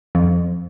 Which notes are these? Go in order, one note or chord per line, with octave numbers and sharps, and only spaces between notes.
F2